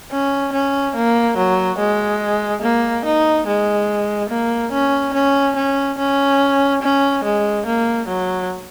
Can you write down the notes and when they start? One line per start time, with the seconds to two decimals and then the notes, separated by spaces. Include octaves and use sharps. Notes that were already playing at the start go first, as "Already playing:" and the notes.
0.11 C#4
0.53 C#4
0.96 A#3
1.37 F#3
1.78 G#3
2.62 A#3
3.05 D#4
3.47 G#3
4.30 A#3
4.72 C#4
5.14 C#4
5.56 C#4
5.98 C#4
6.82 C#4
7.24 G#3
7.66 A#3
8.08 F#3